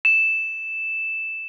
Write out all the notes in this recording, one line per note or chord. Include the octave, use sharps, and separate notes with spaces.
E7